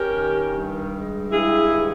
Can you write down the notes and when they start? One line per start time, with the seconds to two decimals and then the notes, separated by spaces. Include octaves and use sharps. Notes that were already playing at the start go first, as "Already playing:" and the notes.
Already playing: C#4 G4 A#4
0.14 D#3
0.53 G2
0.93 G#3
1.32 G2 E4 G#4
1.72 D#3